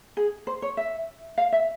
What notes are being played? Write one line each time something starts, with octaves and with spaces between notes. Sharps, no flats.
G#4
C5
C#5
E5
F5
E5